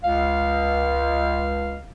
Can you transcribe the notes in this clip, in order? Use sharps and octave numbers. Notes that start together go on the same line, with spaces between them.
C#2 F5